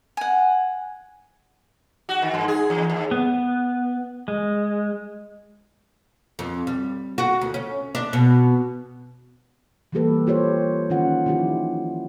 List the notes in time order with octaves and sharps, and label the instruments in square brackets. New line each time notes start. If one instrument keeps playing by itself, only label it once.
[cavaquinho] F#5 G#5
[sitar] F#4
D#3
G2
G#4
E2
D#2
[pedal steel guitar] B3
G#3
[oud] F2
G3
F#4
D2
C#4
D4
B2
[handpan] E3 G3 A#3 G4 A4 B4
F4 G4 C5 C#5
D#3 C#4 F4 F#5
D#3 F3 E4 F4 G4